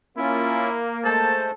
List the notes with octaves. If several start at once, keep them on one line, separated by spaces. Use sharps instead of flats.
A#3 C#4 E4 F4
G#3 A3 A4 C5 A5